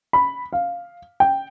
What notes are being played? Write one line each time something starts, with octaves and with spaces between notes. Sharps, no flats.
B5
F5
G5